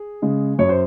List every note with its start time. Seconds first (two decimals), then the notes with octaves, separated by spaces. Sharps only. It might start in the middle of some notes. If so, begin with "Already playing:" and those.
Already playing: G#4
0.22 C#3 G#3
0.59 F#2 C#5
0.69 C5